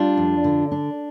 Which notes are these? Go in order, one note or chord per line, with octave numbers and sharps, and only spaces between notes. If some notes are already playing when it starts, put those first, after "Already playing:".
Already playing: G3 D4 F4
F2
D3
D4